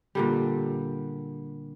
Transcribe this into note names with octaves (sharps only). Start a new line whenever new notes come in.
A#2 D3 G3